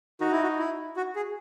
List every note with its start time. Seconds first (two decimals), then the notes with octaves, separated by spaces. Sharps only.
0.21 D#4 F#4
0.31 E4
0.43 F#4
0.59 E4
0.96 F#4
1.16 G#4